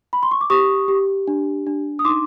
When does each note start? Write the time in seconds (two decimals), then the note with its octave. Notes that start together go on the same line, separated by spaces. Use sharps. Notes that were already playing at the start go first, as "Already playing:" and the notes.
0.13 B5
0.23 C6
0.31 C#6
0.41 D6
0.50 G4 C#6 D#6
0.88 G4
1.28 D4
1.67 D4
1.99 D#6
2.05 D#4 C6 D6